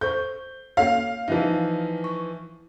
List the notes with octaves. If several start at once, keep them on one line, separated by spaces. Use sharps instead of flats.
A4 C5 C#6 G6
A#3 A4 C#5 F5
E3 F3 D#4 E5
C#6